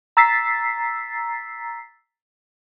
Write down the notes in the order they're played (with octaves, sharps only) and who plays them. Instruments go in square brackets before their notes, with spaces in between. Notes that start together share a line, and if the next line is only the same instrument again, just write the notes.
[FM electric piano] A#5 E6 A6 B6 C7